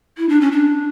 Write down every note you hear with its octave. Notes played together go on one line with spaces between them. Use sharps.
E4
D4
C#4
D4